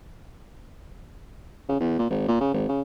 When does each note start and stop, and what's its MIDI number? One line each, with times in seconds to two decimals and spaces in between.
1.69 1.78 49
1.80 1.99 40
1.99 2.09 46
2.10 2.25 32
2.28 2.39 46
2.40 2.53 49
2.54 2.65 32
2.68 2.81 49